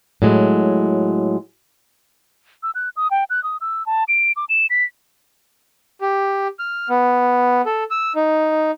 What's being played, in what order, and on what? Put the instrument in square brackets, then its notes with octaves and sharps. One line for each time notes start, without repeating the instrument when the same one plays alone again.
[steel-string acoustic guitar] A2 F#3 G#3
[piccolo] E6
F#6
D#6
G5
F#6
D#6
E6
A5
D7
D6
E7
B6
[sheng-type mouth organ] G4
F6
B3
A4
E6
D#4